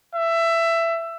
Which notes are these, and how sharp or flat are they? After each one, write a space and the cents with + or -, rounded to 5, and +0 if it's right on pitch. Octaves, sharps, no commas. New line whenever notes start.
E5 +15